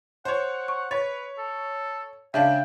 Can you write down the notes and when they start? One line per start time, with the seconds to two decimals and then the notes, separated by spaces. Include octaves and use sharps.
0.25 C5 C#5 F#5
0.68 C#6
0.91 B4 C#5 A6
1.38 A4
2.34 C#3 G#3 D4 E5 F5 G5